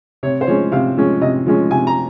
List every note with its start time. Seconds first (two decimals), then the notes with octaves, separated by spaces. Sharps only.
0.23 C3 C#5
0.41 C5
0.47 F3 G#3 C#4 C#5
0.72 C3 F5
0.97 F3 G#3 C#4
1.21 C3 D#5
1.46 F3 G#3 C#4
1.71 C3 G#5
1.87 A#5